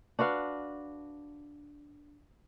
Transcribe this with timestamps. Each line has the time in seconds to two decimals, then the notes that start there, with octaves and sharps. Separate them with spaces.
0.19 D4 F#4 B4 F5